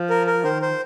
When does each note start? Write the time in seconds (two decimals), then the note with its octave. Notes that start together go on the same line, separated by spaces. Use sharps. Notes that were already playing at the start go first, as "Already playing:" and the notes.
Already playing: F3
0.10 A#4
0.27 A#4
0.44 D#3 C5
0.62 C5